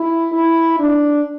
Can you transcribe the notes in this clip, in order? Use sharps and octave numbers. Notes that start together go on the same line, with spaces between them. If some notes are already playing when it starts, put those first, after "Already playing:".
Already playing: E4
E4
D4